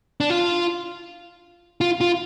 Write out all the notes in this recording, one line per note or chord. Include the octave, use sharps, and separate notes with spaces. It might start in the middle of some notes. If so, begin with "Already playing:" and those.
D4
F4
F4
F4